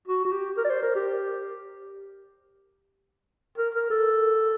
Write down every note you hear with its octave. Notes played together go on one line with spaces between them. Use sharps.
F#4
F#4
G4
A#4
D5
C5
A#4
G4
A#4
A#4
A4